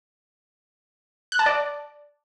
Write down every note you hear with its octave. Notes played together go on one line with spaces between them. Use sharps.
F#6
A5
D5